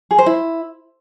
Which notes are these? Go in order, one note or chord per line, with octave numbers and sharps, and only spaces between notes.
G#4
C5
E4